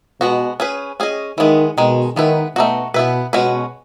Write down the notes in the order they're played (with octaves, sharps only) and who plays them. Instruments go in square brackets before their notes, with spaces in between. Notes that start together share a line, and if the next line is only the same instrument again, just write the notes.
[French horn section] B2 [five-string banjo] G#3 B3 F#4
[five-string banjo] C#4 G#4 B4
C#4 G#4 D#5
[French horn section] D#3 [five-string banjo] E3 G#3 B3
[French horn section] B2 [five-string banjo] D#3 G#3
[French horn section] D#3 [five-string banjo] G#3 B3 E4 B4
[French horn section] B2 [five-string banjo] A3 D#4 F#4
[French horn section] B2 [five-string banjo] B3 E4 B4
[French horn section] B2 [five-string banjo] G#3 C#4 F#4 B4